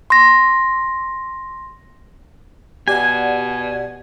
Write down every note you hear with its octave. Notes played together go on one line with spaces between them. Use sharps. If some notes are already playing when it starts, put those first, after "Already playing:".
C6 A#6
B2 G4 D5 F#5 G#5